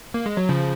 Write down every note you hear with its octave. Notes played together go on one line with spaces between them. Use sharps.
A#3
G#3
F#3
C#3 F3